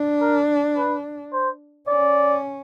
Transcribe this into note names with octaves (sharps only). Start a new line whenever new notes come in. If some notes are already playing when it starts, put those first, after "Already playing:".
Already playing: D4
A#4
B4
C5
C#4 D5